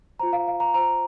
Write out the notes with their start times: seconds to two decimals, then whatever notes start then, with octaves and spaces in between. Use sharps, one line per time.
0.19 F4 C5 A#5
0.33 F5
0.48 F5
0.60 A#5
0.74 F4 C5 A#5